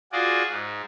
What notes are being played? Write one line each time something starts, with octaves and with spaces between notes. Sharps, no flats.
F4 F#4 G#4 D5
G#2